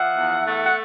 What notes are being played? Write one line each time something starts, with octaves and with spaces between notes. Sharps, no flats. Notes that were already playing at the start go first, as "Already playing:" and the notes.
Already playing: F3 E5 F#5
E2
A3
F#5